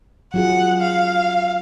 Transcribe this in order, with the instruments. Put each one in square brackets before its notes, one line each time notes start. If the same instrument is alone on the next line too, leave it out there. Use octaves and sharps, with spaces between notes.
[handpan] F#3 F4 G#4 [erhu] F#5
[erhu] F5